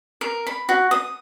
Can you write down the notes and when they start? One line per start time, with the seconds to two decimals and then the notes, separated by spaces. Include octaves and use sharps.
0.21 A#4
0.47 B5
0.69 F#4
0.91 D#6